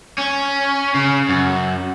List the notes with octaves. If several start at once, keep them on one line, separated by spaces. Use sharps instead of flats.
C#4
C#3
F#2